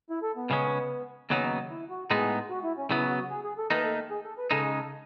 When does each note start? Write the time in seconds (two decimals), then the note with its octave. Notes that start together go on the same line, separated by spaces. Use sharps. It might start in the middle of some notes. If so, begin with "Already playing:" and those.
0.10 E4
0.22 A4
0.36 B3
0.50 C#2 C#3 G#3 C#4
1.30 D#2 C#3 F#3 B3 C#4 D#4
1.70 E4
1.90 F#4
2.11 A2 G#3 B3 D#4 G#4
2.50 F#4
2.63 E4
2.78 C#4
2.90 C#3 F#3 B3 E4
3.10 F#4
3.30 G#4
3.44 G#4
3.58 A4
3.70 D#2 D#3 A3 D#4 B4
3.84 A4
4.10 G#4
4.24 A4
4.38 B4
4.51 C#3 G#3 D#4 A4
4.64 G#4
4.78 A4